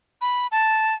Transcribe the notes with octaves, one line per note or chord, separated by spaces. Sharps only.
B5
A5